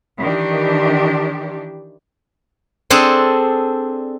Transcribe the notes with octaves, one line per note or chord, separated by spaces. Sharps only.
D#3 E3 D4 G4
C4 D4 G#4 A4